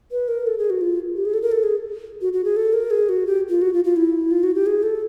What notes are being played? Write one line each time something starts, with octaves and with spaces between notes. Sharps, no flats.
B4
A#4
A4
G#4
F#4
F4
G4
G#4
A4
A#4
A4
G#4
F#4
F#4
G#4
A4
A#4
G#4
F#4
G4
F4
F#4
F4
F4
E4
F4
F#4
G4
G#4
A4